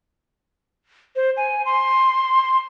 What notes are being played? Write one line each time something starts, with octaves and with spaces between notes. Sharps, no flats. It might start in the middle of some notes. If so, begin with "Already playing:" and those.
C5
G#5
C6